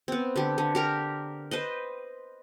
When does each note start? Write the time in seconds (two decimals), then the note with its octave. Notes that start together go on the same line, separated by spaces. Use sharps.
0.08 B3 C4
0.36 D3 G4
0.58 D3
0.75 G4 A#4 A#5
1.51 B4 C5 D#5